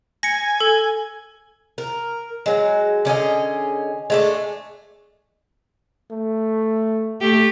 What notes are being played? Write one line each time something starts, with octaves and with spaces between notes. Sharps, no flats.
G#5 A#6 C#7
A4
A#4
F#3 G#3
D3 C#4 G#4 D#5
G#3 A3 D4
A3
A3 G4